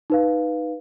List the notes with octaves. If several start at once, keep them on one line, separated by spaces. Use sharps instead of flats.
D#4 B4 F5